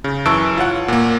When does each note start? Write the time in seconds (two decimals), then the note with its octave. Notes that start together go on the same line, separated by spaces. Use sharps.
0.04 C#3
0.25 F#2 E3 A5 C#6 E6 D7
0.58 F4 C#5 F#5
0.88 A#2 A#3